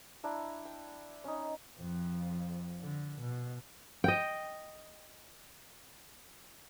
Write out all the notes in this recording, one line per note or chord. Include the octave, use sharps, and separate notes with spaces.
D4 E4 A#5
G5
C#4 D#4
F2 F3
D3
B2
D#5 G5